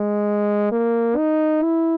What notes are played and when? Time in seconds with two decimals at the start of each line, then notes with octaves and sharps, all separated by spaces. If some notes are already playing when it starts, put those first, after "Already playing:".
Already playing: G#3
0.71 A#3
1.17 D#4
1.63 E4